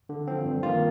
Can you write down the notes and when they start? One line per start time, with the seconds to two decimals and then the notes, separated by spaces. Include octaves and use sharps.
0.09 D3
0.28 F3 C4
0.45 G2
0.63 D#3 A#3 F4